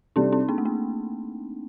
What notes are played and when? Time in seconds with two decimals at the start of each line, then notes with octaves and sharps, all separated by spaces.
0.16 C3 G3 C4 D4 D#4 A4
0.32 C4 D#4
0.49 A#3 D4
0.58 A3
0.65 A#3